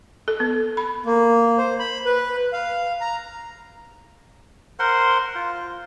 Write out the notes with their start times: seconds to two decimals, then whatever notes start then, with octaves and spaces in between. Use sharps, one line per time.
0.28 A4
0.40 B3
0.77 B5
1.06 A#3
1.58 C5
1.80 B5
2.05 B4
2.53 F5
3.01 A#5
4.79 A#4 C5 F#5 C6
5.35 F4